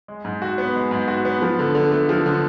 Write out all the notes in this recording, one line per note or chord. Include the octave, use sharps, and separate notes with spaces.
G#3
G#2
F#4
B3
G#3
G#2
F#4
B3
F3
D3
D3
A3
F3
D3